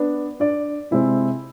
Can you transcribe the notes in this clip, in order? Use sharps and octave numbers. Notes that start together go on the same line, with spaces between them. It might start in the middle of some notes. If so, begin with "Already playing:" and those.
Already playing: B3 D4
D4 D5
C3 G#3 C4 E4 E5